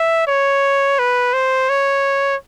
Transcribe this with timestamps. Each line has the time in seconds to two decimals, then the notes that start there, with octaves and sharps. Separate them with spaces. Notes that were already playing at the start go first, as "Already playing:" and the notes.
Already playing: E5
0.27 C#5
0.99 B4
1.33 C5
1.69 C#5